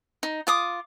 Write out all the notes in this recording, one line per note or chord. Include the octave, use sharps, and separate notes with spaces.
D#4
F4 D6 D#6